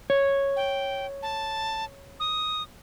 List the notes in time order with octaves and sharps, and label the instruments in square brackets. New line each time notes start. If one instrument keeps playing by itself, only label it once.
[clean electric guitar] C#5
[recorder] G5
A5
D#6